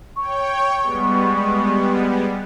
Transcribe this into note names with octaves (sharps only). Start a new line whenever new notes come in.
C#5 G5 C#6
G3 G#3 B3